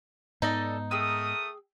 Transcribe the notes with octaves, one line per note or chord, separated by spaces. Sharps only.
G#2 B3 D#4 A4 D5 D#5
A3 G#4 A#4 G5 D#6 E6